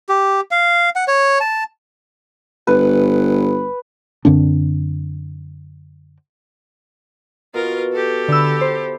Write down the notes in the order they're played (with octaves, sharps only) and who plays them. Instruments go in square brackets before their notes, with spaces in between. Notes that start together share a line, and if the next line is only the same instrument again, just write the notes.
[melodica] G4
F5
F#5
C#5
A5
[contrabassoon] G1 [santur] B4
[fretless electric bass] F#2 D3 C4 D4
[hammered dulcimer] B2 [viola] F4 A#4
[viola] G4 A4
[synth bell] D3 E6 [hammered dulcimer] E4
[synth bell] C5